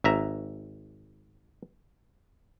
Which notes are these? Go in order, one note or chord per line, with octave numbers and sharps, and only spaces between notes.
G#1 E5 A#5